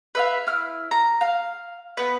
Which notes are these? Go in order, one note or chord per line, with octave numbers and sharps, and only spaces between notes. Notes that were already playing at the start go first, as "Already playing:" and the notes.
B4 E5 F5
E4 F6
A#5
F5
B3 B4